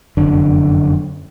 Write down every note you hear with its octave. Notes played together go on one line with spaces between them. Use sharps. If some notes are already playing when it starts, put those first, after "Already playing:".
F1 F#2 D3